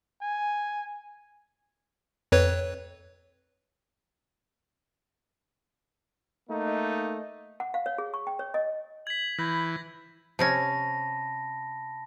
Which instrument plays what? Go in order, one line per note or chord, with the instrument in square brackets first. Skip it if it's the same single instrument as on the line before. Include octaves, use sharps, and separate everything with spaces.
[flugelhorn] G#5
[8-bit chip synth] F2 B4 C#5
[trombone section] A3 A#3 D#4
[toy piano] F#5
F5
C#5
G#4
C#6
G5
C#5
D#5
[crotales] G#6 B6 [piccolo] F#7
[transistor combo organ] E3 [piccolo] B5 [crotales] G6 A#6 F#7
[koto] C3 C4 C#4 [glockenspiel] A5 B5 A#6